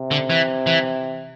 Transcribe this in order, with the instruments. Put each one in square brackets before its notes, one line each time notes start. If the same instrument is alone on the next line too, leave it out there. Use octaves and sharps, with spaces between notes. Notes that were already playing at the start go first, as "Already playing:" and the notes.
Already playing: [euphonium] C3
[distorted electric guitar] D3
E3
E3